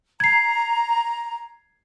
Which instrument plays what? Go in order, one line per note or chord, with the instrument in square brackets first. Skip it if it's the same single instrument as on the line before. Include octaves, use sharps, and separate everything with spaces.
[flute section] A#5 [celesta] G#6 C7